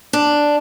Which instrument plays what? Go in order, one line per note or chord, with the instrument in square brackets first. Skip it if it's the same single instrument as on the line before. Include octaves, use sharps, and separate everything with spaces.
[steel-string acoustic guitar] D4